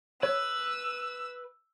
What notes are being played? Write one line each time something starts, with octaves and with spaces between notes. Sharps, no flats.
B4 C#5 E6